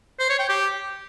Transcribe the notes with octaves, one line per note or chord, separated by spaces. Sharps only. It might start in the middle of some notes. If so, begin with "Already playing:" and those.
C5
C#5
G5
G4